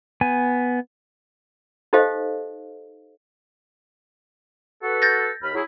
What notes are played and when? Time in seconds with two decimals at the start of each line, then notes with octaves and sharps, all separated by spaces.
0.21 B3 G#5
1.93 D#4 G4 A4 C5 D#5 F5
4.83 F#4 A4 B4
5.02 G6 A6 A#6
5.42 D#2 B5 F6
5.54 F#3 E4 G#4